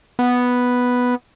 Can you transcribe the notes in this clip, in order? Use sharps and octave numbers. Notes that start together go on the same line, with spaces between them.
B3